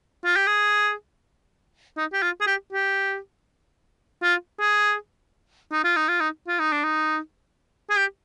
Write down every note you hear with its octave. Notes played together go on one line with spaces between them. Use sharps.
F4
G4
G#4
D#4
G4
F4
G#4
G4
G4
F4
G#4
D#4
F4
D#4
F4
D#4
F4
D#4
D4
D#4
G#4
G4